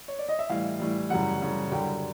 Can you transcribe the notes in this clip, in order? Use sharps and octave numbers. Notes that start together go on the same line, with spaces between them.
C#5
D5
D#5
E5
A2 E3 G3 F5
A2 E3 G3
F#2 C#3 E3 G3 F#5
F#2 C#3 E3 G3
F#2 D3 G3 G5